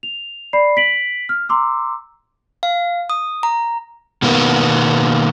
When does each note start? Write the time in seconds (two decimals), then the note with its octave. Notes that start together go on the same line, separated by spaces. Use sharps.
0.03 F7
0.53 D5 B5 C7
0.77 B6 D7 F#7
1.29 F6
1.49 A#5 C6 D6 E6
2.63 F5
3.10 D#6
3.43 A#5
4.22 B2 D#3 A#3 B3